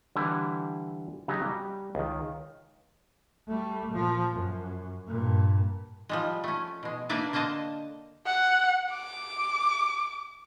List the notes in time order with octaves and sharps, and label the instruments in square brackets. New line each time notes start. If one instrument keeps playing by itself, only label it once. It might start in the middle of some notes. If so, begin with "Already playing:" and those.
[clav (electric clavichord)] D3 E3 G3 E4
C#3 F#3 D#4 G4
G3
C#2 D#3
[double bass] G3 A3
A#2 F3
F#2
G2 A#2
[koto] F3 G3 G#3
A3 C#4
B2 G#3
A#3 D4 A#4 B4 D5 E5
D3 A#3 C5 D#5 A5
[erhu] F#5
D6